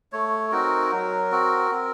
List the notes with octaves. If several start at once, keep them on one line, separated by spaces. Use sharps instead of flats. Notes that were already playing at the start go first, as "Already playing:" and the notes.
A3 C#5
C4 D#4 F#4 A#4
F#3
C4 F#4
C4